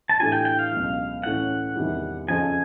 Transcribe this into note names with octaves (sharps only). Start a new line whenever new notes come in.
A5
A2 E3 A3 D4 G4 G#5
G5
G5
F5
C#2 B2 F#3
A2 E3 A3 C#4 F#5
E2 C3 D#3 G3
F2 C#3 F3 G#5